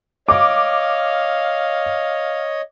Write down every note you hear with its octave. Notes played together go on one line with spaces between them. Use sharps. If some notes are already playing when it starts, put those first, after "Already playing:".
C#5 D#5 F5 D6